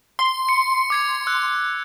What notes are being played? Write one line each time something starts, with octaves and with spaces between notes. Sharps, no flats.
C6
C#7
D6 G#6 C#7
E6 F#6